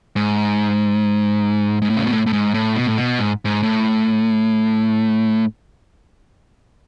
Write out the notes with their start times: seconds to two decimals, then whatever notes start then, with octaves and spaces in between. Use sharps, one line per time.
0.16 G#2
1.82 G#2
1.90 A2
1.97 C#3
2.04 B2
2.11 A2
2.26 A2
2.33 G#2
2.54 A2
2.76 B2
2.87 A2
2.98 B2
3.19 G#2
3.45 G#2
3.63 A2